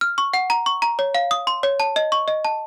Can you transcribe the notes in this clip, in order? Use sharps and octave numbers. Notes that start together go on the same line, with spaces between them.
F6
C#6
F#5
A#5
C#6
A#5
C#5
F5
D#6
C6
C#5
A5
D#5
C#6
D#5
A5